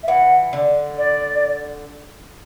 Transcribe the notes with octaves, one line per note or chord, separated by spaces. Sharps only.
E5
E3 F#5
D3
D5